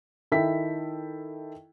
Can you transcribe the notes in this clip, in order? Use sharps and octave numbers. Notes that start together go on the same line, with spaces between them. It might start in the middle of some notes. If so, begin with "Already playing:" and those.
D#3 E4 A4 E5 G5 B6